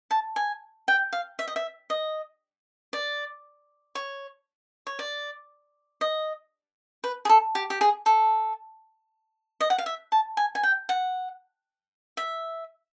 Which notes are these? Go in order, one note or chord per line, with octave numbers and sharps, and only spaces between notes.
A5
G#5
G5
F5
E5
D#5
E5
D#5
D5
C#5
C#5
D5
D#5
B4
G#4
A4
G4
G4
G#4
A4
D#5
F#5
F5
E5
A5
G#5
G#5
G5
F#5
E5